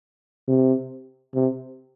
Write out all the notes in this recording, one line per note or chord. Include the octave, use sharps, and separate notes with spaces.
C3
C3